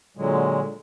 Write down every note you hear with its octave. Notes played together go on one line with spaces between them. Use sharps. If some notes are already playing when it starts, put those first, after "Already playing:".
A#2 D3 F#3 G#3